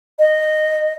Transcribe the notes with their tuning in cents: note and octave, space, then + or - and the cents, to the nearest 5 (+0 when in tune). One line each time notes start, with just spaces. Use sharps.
D#5 -10